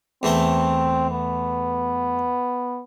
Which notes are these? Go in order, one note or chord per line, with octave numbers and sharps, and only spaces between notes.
E2 A3 C4 G5
B3